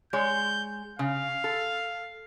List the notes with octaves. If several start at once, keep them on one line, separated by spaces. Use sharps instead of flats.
G#3 C#5 G6
C#3 F5
A4